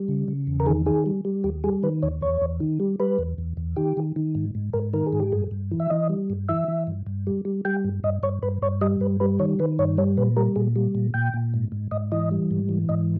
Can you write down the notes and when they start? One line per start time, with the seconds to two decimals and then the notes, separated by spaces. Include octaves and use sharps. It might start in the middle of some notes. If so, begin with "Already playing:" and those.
Already playing: G3
0.08 C#3
0.28 C#3
0.47 E2
0.60 A#4
0.66 D#3 G#4
0.86 D#3 G#4
1.06 G3
1.25 G3
1.44 D#2 G4
1.64 G3 G#4
1.83 D#3 B4
2.02 D#2 C#5
2.21 E2 C#5
2.42 E2
2.60 D#3
2.80 G3
3.00 G3 B4
3.19 E2
3.38 E2
3.57 E2
3.76 D#3 G4
3.97 D#3
4.16 D#3
4.35 G#2
4.55 G#2
4.73 G#2 A#4
4.93 D#3 A#4
5.06 G#4
5.13 G#2
5.20 G4
5.32 G2 G#4
5.51 G2
5.72 E3
5.80 E5
5.90 E3 D#5
6.09 G3
6.30 G2
6.49 E3 E5
6.68 E3
6.87 G2
7.07 G2
7.27 G3
7.45 G3
7.65 G3 G5
7.84 G2
8.04 G2 D#5
8.23 G2 C#5
8.43 G2 B4
8.62 G2 C#5
8.81 G3 D#5
9.00 G2 B4
9.20 G3 B4
9.39 D#3 C#5
9.59 D#3 B4
9.79 G2 C#5
9.98 G3 C#5
10.17 A#2 B4
10.36 G3 A#4
10.56 A#2 G#4
10.76 G3
10.95 A#2
11.14 A#2 G5
11.34 A#2
11.54 G#2
11.72 G#2
11.91 G#2 D#5
12.12 E3 D#5
12.31 G3
12.51 G#2
12.69 E3
12.89 G#2 D#5